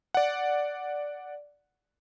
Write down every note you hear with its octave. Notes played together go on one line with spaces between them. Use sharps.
D5 F#5